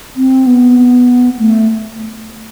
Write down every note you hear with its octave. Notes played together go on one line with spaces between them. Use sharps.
C4
B3
A3